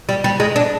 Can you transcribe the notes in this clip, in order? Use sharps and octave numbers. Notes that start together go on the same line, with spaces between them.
G3
G3
G#3
D4